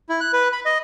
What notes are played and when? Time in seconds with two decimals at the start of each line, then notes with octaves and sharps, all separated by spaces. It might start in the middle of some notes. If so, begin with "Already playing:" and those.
0.09 E4
0.21 F#6
0.33 B4
0.52 B5
0.65 D#5